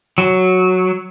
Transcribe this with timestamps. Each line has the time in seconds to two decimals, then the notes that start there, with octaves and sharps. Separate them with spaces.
0.18 F#3